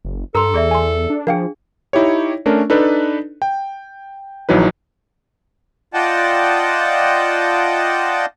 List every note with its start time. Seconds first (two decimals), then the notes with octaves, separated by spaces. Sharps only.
0.05 F#1
0.35 G2 A4 A#4 A#5 C6 E6
0.54 E2 G#4 D5 E5
0.71 G#5 C6
1.10 D4
1.27 F3 D4 G#4 A#4 F5 G5
1.93 D#4 E4 G4 C#5
2.46 A3 C#4 D4 A#4
2.70 D4 D#4 A4 B4
3.42 G5
4.49 A#1 E3 F#3 D#4 B4
5.94 F4 D5 D#5 F#5 G5 A5